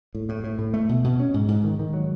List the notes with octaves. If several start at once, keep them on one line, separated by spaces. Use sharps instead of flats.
A2
A2
A2
A2
A3
B2
B2
C#4
G#2
G#2
D#3
D#3
F#3